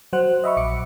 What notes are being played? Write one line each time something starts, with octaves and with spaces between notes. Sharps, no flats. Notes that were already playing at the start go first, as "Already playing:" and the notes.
F#3 C5 F#5 F#6
D#5 E5 B5 C#6
A#1 D6 C#7